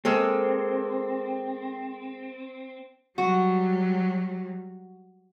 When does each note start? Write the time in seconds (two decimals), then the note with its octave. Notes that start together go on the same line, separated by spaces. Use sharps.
0.05 G#3 A#3 C4 A4
3.18 F#3 G3 F#4